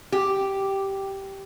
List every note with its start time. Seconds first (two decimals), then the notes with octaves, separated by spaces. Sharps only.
0.12 G4